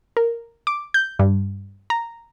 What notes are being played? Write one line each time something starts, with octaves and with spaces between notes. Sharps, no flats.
A#4
D6
G6
G2
A#5